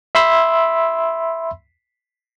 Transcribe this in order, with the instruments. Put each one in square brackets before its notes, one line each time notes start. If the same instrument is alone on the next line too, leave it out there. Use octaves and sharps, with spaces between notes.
[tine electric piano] E5 B5 C6 E6